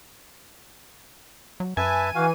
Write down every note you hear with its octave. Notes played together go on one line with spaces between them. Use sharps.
F#3
F#2 B4 E5 G#5 A5
E3 F#4 F5